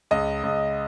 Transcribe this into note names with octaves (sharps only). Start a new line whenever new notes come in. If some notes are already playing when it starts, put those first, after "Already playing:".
C#2 D#5
C#2